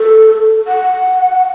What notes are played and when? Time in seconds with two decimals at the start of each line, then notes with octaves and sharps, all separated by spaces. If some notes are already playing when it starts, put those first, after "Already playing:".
Already playing: A4
0.67 F#5